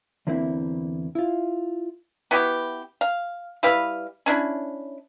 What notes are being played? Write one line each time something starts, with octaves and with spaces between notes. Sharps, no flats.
E2 D3 A#3 C4 E4
E4 F4
B3 E4 F#4 G4
F5
G3 E4 B4 F5
C#4 D4 E4